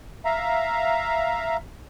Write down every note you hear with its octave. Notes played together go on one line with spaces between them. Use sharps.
E5 F5 A#5